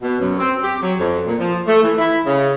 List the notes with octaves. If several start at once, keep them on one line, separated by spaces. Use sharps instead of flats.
B2
F#2
C4
G4
F#3
F2
A#2
F3
A3
E3
E4
C#3